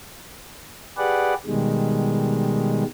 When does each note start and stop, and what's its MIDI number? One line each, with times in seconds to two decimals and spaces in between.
0.98 1.34 67
0.98 1.34 68
0.98 1.34 71
0.98 1.34 74
0.98 1.34 78
1.46 2.84 47
1.46 2.84 51
1.46 2.84 55
1.46 2.84 56